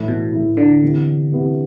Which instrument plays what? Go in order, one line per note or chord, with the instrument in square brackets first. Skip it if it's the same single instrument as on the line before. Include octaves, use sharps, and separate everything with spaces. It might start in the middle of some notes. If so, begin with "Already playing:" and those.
Already playing: [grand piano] A2 E3 A3 E4
[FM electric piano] B2
[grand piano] A2 E3 A3 E4
[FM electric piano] D3
[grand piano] C3 E3 B3
C3 E3 B3